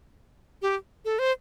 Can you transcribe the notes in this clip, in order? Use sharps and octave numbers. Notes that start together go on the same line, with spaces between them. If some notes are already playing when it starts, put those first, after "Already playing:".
G4
A4
C5